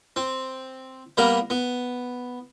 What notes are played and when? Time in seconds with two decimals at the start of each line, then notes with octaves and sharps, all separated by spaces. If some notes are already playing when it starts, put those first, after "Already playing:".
0.16 C4
1.17 G3 A#3 B3 A#4 A#5
1.50 B3